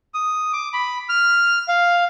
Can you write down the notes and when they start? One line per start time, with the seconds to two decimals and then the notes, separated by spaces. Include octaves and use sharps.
0.14 D#6
0.53 D6
0.73 B5
1.09 F6
1.68 F5